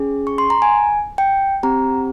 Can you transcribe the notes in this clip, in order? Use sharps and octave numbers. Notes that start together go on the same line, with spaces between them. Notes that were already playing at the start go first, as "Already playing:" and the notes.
Already playing: C#4 G#4
C#6
C6
A#5
G#5
G5
C4 G4 A#5